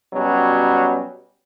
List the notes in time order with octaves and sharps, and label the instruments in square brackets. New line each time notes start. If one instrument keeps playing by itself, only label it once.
[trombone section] B2 F#3 G3 C#4